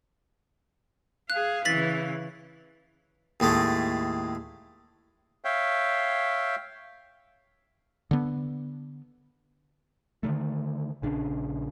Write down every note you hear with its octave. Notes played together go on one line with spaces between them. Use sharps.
G#4 F5 F#6
C#3 E3 A6 B6 F#7
D#2 A2 G#3 A3
C#5 E5 F5 G5
D3 B3
D3 D#3 A3
A#1 C#3 D4